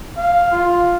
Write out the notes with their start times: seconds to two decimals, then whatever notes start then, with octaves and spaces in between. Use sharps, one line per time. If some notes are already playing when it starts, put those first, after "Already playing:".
0.17 F5
0.51 F4